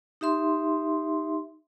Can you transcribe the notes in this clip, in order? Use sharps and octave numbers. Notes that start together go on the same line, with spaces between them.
D#4 G4 E5 C6